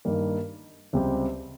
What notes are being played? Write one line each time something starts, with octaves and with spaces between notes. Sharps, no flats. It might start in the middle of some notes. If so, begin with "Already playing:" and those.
G2 D#3 G3 A#3
C#2 C3 G3 C4 G4